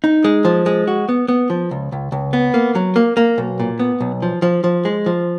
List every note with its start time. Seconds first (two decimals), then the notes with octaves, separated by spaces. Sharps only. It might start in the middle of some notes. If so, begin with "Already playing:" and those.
0.04 D#4
0.24 G#3
0.45 F3
0.66 G#3
0.87 F#4
1.09 B3
1.28 B3
1.50 F3
1.71 C#2
1.92 C#2
2.12 C#2
2.33 B3
2.54 A#3
2.75 F#3
2.96 A#3
3.17 A#3
3.38 B1
3.60 A#2
3.79 B3
4.01 B1
4.22 F3
4.42 F3
4.64 F3
4.85 G#3
5.06 F3